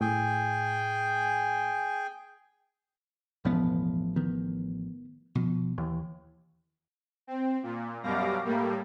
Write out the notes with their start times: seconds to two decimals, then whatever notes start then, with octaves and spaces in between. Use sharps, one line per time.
0.01 A2 G#4 G5 G#5
3.45 E1 A1 A2 F3 B3
4.16 D#3 B3
5.35 B2 F3
5.78 D#2 E3
7.27 C4
7.63 A#2
8.03 F#2 B2 G3 F5 D6 A#6
8.45 A2 G3 A#3